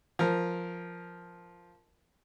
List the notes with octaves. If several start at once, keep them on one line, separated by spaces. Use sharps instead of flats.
F3 A#4